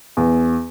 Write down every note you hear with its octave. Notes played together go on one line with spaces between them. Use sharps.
E2